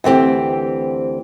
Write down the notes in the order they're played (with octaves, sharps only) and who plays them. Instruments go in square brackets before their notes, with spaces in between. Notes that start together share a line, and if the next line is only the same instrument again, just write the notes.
[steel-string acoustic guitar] D2 E3 C4 G4